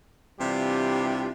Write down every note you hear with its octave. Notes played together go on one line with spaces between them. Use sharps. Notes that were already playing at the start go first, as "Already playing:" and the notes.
C3 E3 G3 D4 F4 G4